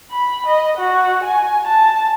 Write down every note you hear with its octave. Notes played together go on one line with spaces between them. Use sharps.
B5
D#5
F#4
G#5
A5